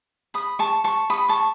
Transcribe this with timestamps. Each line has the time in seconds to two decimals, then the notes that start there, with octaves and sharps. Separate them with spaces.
0.34 B5 D#6
0.59 A5 C#6
0.84 A5 C#6
1.10 B5 D#6
1.29 A5 C#6